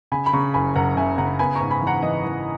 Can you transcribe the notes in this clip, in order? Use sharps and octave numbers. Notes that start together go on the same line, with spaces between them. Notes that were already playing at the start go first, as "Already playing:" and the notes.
C#3 G#5 B5
B5
C#3 A#5 C#6
F#1 G#5 B5
F#1 F#5 A#5
C#3 E5 G#5
C#3 F#5 A#5
B3 G#5 B5
A#5 C#6
G#2
G#5 B5
E3
F#5 A#5
E3 D#5
E3